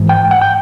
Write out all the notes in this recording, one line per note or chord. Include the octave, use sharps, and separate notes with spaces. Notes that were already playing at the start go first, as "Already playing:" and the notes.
Already playing: G#2 E3
G5
F#5
G5